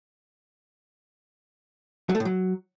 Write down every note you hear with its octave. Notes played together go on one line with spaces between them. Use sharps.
F#3
A3
A2
F#3